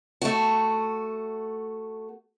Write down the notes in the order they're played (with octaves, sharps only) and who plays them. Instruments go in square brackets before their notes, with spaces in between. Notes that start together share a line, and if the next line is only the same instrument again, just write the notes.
[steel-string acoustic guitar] A3 F#4